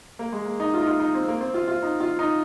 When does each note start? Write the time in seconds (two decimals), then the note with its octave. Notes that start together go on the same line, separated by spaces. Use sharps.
0.19 A#3
0.33 G#3
0.45 A#3
0.60 D#4
0.74 F4
0.82 D#4
0.87 F4
1.00 D#4
1.14 C4
1.28 A#3
1.41 C4
1.54 F4
1.68 F4
1.83 D#4
2.00 F4
2.19 D#4